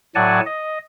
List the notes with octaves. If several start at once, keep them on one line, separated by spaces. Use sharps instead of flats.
A2 F#3 D5 F#5 G#5 A5
D#5